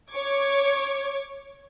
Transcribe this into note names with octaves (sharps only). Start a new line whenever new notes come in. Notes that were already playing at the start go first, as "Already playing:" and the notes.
C#5 C#6 D6 G#6